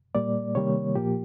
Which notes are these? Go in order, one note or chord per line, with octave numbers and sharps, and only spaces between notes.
A#2 G3 A#3 D5
C3 D#3 G3 A#3 C#5
A#2 F3 A#3 G4